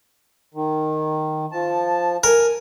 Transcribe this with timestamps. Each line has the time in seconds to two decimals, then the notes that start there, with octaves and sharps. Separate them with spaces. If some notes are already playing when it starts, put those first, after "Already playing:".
0.54 D#3
1.52 F3 A5
2.24 A#4 G#5